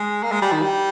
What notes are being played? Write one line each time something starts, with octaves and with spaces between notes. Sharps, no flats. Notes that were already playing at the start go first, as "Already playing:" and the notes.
Already playing: G#3
A#3
G#3
G3
D#3
G3